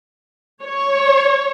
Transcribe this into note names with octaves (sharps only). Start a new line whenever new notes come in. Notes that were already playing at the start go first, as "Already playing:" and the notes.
C#5